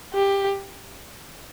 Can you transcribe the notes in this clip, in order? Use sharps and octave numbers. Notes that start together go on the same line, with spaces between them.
G4